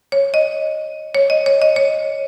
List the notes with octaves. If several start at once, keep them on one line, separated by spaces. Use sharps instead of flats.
C#5
D#5
C#5
D#5
C#5
D#5
C#5